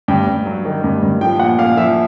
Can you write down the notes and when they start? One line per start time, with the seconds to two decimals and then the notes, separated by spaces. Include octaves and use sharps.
0.08 G2 G5
0.27 G2
0.46 F#3
0.65 D#3
0.84 G2
1.03 G2
1.21 F3 G5
1.39 A#2 F#5
1.59 A#2 F5
1.77 F3 E5